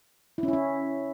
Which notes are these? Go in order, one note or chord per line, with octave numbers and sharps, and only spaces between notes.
E4
C#4
E4
C#4